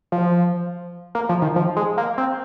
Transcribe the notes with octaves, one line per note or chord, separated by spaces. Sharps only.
F3
A#3
F3
D#3
F3
G#3
A#3
C4